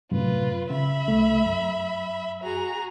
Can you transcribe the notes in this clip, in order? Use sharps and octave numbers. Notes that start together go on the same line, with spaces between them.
F#2 A2 C3 F4 B4
C#3 E5 B5
C2 A3
F#2
F#4 G#4 A#5